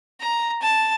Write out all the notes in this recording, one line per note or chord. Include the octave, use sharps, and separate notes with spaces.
A#5
A5